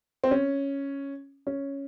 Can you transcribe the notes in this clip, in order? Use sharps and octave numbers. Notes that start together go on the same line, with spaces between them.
C4
C#4
C#4